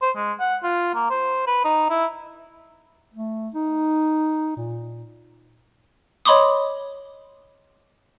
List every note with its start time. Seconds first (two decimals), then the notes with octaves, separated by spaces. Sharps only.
0.02 C5
0.17 G#3
0.40 F#5
0.63 F4
0.95 A#3
1.11 C5
1.47 B4
1.65 D#4
1.90 E4
3.14 A3
3.54 D#4
4.56 A#2
6.25 C#5 D#5 B5 C6 D6 D#6